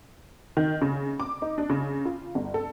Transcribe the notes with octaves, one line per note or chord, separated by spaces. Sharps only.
D#3
C#3
D6
D#4
D4
C#3
F4
G1
A4